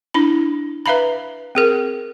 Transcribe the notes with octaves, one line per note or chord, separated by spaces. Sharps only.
D4 E4 B5
B4 E5 F5 A#5 B5
C4 G#4 A#4